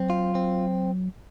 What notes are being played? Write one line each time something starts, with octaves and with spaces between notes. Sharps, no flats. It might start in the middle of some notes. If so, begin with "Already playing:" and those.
Already playing: F#3 C4
F4
C4